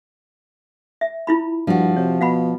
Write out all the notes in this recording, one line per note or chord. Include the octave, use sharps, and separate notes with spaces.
E5
E4 F4 B5
G2 F3 F#4
C3 C#5
B2 F5 F#5 B5